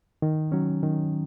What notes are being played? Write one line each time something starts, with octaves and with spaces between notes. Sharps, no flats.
D#3
F#3 C#4
D#3